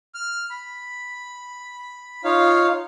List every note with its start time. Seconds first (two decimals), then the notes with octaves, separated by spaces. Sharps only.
0.14 F6
0.50 B5
2.24 D#4 F4 C#5 F5